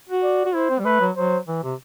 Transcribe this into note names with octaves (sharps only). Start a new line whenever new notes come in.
F#4
D5
F#4
E4 C5
C4
G3
A3 B4
F#3
F#3 C5
E3
C3